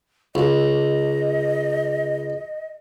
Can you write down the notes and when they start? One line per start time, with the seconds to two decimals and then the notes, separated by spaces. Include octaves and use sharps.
0.35 C#2 D#5